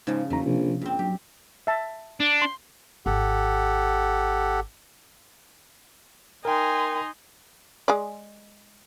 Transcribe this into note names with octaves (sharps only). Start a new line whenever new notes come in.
G#2 C#3 F3
F#1 E2 A3 D#4 A#5
A#1 C3 F3
A#1 G2 C4
F#3 G4
E5 A5
D4
C6
G#1 G4 A4 F#5
D#4 A#4 G5 G#5 C6
G#3 G#4 D5